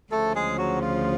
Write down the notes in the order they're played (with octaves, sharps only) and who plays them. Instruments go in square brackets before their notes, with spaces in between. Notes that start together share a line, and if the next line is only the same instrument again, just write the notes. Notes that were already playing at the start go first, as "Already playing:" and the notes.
[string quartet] D2 C#3 F3 [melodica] A3 A4
[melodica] G#3 G#4
F#3 F#4
F4